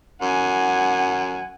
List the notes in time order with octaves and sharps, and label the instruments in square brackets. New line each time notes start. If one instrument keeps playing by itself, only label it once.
[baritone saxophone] F#2 [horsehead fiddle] F#5 G#5